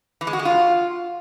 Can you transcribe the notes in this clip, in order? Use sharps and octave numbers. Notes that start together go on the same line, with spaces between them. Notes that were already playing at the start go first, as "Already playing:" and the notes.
E3
G#3
F#4
G#3
F4